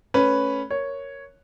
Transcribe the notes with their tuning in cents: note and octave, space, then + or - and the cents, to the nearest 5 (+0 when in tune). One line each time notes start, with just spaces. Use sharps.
A3 +0 C#4 +0 B4 +0
A#4 +0 C#5 +0